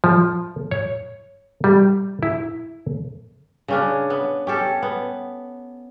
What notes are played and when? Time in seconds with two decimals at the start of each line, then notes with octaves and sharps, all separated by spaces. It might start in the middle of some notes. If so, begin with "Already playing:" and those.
0.04 F3
0.71 C#5
1.64 G3
2.23 E4
3.68 C#3 C#4 D4
4.10 B3
4.47 C#4 G4 A4
4.82 B3